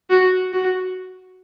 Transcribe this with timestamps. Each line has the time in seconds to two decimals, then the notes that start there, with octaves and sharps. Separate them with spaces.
0.10 F#4
0.53 F#4